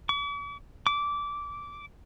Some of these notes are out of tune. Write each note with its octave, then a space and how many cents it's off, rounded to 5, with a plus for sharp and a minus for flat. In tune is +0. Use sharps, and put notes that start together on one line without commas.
D6 -45
D6 -15